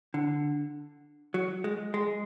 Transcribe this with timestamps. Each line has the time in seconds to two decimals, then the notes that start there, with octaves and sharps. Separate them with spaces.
0.14 D3
1.34 F#3
1.64 G#3
1.94 G#3